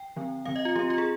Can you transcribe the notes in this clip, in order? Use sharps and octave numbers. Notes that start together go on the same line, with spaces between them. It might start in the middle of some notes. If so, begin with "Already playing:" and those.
Already playing: G5
D3 F3 C4
D3 F3 C4 F5
D#5
F4
F3 C4 G4
F4
G#4